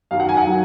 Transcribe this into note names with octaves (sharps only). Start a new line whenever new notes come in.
F#2 D#3 F#3 F5
F#5
G#5
F#5
D#3 F#3